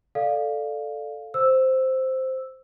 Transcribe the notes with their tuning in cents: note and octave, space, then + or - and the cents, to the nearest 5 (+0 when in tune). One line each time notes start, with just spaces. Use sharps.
A4 +0 D5 +15 F5 +0
C5 +0 E6 +0